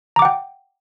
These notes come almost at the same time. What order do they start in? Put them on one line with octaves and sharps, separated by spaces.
A#5 D6 F#5 G5